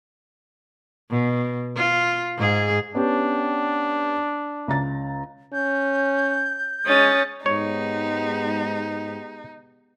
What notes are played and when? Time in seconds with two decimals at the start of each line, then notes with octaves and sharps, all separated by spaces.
1.10 B2
1.76 F4
2.37 G#2 G#4
2.95 B3 C#4 D4 G4
4.68 C#2 A#5 A6
5.53 C#4 G6
6.86 G#3 C#4 D#6 A6
7.46 G#2 G#3 B3 D#4 G4 C#5